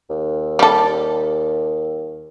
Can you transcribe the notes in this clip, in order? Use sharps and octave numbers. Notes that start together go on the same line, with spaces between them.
D#2
G3 A4